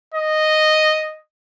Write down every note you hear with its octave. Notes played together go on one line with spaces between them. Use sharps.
D#5